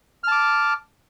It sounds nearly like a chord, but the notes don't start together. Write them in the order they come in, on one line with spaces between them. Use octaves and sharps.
F6 A5 D6